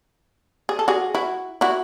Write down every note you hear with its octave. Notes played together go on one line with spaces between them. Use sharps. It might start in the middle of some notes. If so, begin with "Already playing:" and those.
G#4
A4
F#4 G#4
E4 F#4
E4 F#4